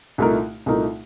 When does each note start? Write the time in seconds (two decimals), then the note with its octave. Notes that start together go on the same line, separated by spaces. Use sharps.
0.18 C2 A#2 A3 D#4 A#4
0.66 C2 A#2 A3 D#4 A#4